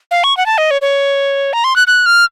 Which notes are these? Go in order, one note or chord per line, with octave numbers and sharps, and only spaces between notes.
F5
C#6
F#5
A5
D#5
C#5
C#5
A#5
C6
F#6
F#6
F6